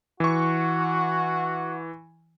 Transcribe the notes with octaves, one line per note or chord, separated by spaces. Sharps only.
E3 F#4 C#6